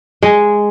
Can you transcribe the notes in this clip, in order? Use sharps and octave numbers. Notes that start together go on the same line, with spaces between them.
G#3